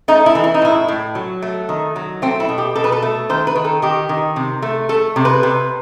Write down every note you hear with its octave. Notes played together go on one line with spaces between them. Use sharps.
A3 D#4
E4
E3
E4
D#4
A2 E4
A2
F#3
A3
D#3
F#3
A3 C4
E4
B2
G4
B2 A4
B4
A4
A3
D#3 C5
B4
D#3
A4
D#3 G4
D#3
C3
A3
A3 A4
C3
B4
C3